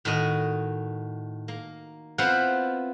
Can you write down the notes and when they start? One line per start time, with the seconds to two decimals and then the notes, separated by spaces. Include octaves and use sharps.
0.05 A2 D#3 F#4 D#5
1.48 A#3
2.18 B3 C4 E4 F4 C5 F#5